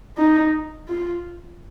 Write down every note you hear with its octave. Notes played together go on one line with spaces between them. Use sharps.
D#4
F4